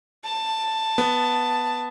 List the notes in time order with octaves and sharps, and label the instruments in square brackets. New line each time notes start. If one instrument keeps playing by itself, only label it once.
[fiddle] A5
[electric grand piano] B3